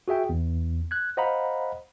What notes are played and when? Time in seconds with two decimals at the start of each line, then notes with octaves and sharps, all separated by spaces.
0.08 F#4 G#4 E5 G5
0.29 E2
0.91 F#6 G#6
1.17 C5 D#5 F5 F#5 A#5 B5